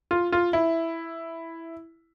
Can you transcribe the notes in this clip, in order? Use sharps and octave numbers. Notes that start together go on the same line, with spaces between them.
F4
F4
E4